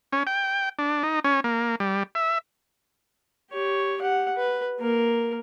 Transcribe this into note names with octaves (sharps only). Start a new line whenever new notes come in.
C#4
G5
D4
D#4
C#4
A#3
G3
E5
G4 C#5
G4 F#5
B4
A#3 A#4